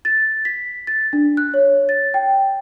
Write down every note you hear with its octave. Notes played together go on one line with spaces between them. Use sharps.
A6
B6
A6
D4
F#6
C#5
A6
G5